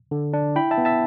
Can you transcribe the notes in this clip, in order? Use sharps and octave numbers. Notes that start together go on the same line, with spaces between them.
D3
D4
E4 G5 B5
E5 A5
B3
E5 A5